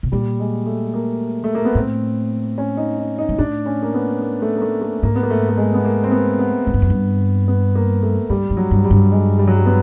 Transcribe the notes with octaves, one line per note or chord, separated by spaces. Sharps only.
B2
A#2 G3
G#3
A3
A#3
A3
A#3
B3
A2 C4
C#4
D#4
D#4
D#4
G#2
A2 D4
C#4
A#3
B3
A#3
A3
A#3
A3
A3
G#2 A#3
B3
A#3
A3
A3
G#3
B3
A#3
C4
B3
B3
G#2
G2
F#2
G2
B3
A#3
A3
G2 G3
G2
F#3
G2
G3
G2
G#3
G3
F#3
G3
B3